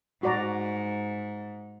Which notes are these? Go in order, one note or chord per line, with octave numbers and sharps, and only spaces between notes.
G#2 F#4 D5 A#5